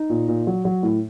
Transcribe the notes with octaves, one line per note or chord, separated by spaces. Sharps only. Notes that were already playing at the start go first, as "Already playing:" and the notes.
Already playing: D#4
A#2
A#2
F#3
F#3
A2